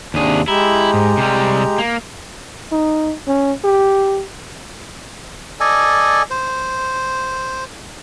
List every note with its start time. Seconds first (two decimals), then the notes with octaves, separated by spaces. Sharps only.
0.14 D#2 C3 D4 G#4
0.48 G#3 E4 G4 A#5
0.94 G#2
1.17 C3 G3
1.78 A#3
2.72 D#4
3.27 C#4
3.64 G4
5.60 A4 D5 D#5 G#5
6.30 C5